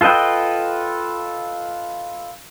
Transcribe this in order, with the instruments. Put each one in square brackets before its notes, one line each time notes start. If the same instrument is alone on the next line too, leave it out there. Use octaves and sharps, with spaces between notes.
[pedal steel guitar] F4 A4 B4 D#5 G5